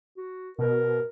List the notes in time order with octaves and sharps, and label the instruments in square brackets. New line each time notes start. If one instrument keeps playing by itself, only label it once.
[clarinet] F#4
[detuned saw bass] B2 [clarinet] A#4